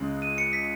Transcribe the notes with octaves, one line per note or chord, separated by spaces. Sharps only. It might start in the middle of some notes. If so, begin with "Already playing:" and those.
Already playing: C#2 C#3 G#3
D#7
C#7
B6